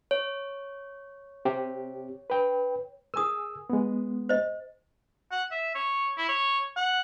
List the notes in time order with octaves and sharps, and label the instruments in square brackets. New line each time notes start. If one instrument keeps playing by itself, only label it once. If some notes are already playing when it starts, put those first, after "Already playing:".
[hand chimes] C#5
[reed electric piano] C4 G4
B4 G5
[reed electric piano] G#4 G#5 E6 [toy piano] A#4 D#6
[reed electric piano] G#3 B3
[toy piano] C5 D#5
[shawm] F#5
E5
C#5
E4
C#5
F#5